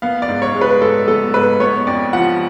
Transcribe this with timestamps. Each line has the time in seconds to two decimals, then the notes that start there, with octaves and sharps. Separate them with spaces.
0.02 B3 F5
0.22 D5
0.29 G#2
0.42 C#5
0.55 G#3
0.61 B4
0.81 G#2 A4
1.08 B3 A4
1.34 G#2 B4
1.60 B3 C#5
1.87 F2 D5
2.13 F3 F#5